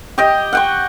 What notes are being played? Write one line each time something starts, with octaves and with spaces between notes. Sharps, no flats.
G4 D#5 G5
F#5 G5 C#6